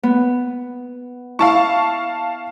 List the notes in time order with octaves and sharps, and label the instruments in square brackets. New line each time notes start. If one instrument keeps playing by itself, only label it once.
[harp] B3
[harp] E4 [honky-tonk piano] F5 A5 C#6